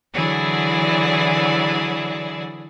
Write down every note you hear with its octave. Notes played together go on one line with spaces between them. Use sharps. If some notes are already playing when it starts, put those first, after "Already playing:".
D3 E3 F#3 E4 G#4 D5